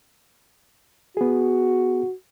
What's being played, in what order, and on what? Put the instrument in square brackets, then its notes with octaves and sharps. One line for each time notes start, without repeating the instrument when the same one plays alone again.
[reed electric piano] B3 G#4 [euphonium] F#4